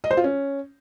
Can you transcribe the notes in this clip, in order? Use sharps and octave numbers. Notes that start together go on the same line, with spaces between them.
D#5
C5
F4
C#4